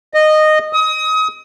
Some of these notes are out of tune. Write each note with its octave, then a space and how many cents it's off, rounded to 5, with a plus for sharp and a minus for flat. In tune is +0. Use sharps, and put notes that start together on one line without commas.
D#5 -15
D#6 +30